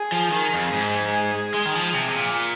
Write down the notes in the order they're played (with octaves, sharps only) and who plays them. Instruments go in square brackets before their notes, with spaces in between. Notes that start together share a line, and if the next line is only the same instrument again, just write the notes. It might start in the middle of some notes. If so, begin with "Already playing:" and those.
Already playing: [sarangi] G#4
[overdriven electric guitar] F3
D#3
F2
G#2
G#3
D#3
F3
C3
C3
A#2